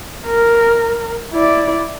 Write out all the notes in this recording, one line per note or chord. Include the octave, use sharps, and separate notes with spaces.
A#4
E4 D5